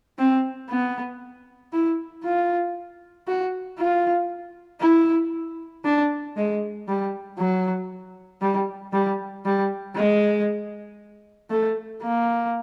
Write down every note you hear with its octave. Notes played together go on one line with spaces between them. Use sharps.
C4
B3
E4
F4
F#4
F4
E4
D4
G#3
G3
F#3
G3
G3
G3
G#3
A3
A#3